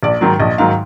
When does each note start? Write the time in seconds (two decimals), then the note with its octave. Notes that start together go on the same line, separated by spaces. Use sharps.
0.03 A#1 D5
0.21 G#2 D#3 F#3
0.40 A#1 D#5
0.58 G#2 D#3 F#3 F5